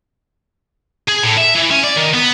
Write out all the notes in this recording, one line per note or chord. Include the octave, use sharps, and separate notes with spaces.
G#4
A2
E5
E3
C#4
D5
D#3
B3